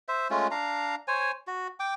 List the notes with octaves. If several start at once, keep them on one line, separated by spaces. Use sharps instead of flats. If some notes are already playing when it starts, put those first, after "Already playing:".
C5 E5
G#3 A3 C#4 F4
D4 F5 A#5
C5 C#5 G#5
F#4
G5 D6